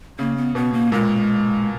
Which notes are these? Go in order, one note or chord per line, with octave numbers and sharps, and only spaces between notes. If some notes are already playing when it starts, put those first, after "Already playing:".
C#3 A#3
B3
B2 B3
A#3
A#2 G#3